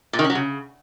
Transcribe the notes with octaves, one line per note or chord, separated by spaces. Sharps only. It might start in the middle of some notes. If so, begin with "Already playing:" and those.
A#2
D#3
C#4
F#3
C#3